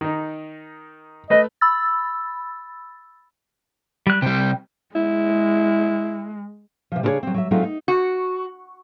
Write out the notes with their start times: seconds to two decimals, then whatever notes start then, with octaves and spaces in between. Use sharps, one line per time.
0.01 D#3 D#4
1.30 A3 B4 D#5
1.61 B5 E6 A6
4.07 G3 F#6
4.22 C3 G3 G5
4.96 G#3 E4
6.92 C3 F3
7.03 C#3 D4 E4 G4 G#4 C#5
7.23 F#3 C4
7.34 F#3 C5 E5
7.51 F#3 G#3 A3 C4 D#4 F4
7.63 D#4
7.88 F#4